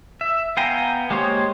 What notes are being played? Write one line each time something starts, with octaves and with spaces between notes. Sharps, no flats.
E5
B3 F5 G5 G#5 A#5
G#3 A#3 G4 C5 C#5